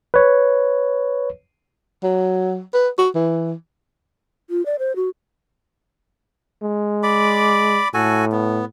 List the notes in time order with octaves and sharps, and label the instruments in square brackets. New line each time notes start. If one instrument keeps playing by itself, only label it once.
[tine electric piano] B4 C#5
[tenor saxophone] F#3
B4
F#4
E3
[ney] F4
D5
C5
F#4
[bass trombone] G#3
[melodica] D5 B5 D6
[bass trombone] A2 [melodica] F#4 A4 G#5
[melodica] B3